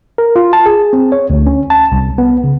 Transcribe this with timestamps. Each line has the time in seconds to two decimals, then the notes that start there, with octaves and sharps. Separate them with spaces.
0.18 A#4
0.36 F4
0.53 A5
0.66 G#4
0.93 C4
1.12 C#5
1.30 D2
1.47 C#4
1.70 A5
1.92 C2
2.18 B3
2.44 C#3